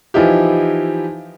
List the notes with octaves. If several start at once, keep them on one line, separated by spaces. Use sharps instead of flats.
E3 F3 D#4 E4 G4